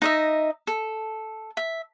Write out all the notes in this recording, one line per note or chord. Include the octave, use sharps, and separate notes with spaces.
D#4 D#5 E5
A4
E5